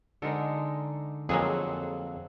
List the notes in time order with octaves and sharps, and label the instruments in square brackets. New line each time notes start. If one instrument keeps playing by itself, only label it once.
[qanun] D3 D#4 A#4 [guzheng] G#3 A4
[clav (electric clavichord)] F2 A#3 [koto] F#3 G#3 G#4 [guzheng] C4 F#4 A4